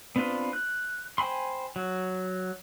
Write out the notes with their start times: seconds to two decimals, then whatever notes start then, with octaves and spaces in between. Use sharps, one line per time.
0.16 B3 C4 D4 F4 B4
0.53 F#6
1.18 C5 G5 G#5 B5 C6
1.76 F#3